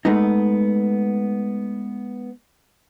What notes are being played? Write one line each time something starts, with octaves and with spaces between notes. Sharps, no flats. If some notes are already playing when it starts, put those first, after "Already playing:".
G#3 A3 B3 D#4